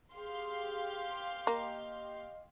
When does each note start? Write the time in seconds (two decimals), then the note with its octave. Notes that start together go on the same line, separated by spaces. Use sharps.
0.14 G4 G#4 F5 C6
1.47 A#3 D#5